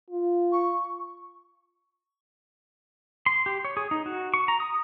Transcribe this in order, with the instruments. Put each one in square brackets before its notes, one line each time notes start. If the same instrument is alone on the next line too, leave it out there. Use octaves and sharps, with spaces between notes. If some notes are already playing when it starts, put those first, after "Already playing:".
[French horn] F4
[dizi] C#6
[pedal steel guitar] C6
G4
C#5
G#4
D#4
F#4
C#6
A#5
D#6